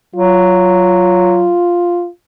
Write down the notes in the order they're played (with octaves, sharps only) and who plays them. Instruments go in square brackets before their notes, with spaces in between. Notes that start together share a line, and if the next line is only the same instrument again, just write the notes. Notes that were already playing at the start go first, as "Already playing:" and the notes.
[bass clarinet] F#3 [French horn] F4